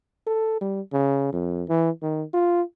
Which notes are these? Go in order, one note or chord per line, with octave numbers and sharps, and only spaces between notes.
A4
G3
C#3
F2
E3
D#3
F4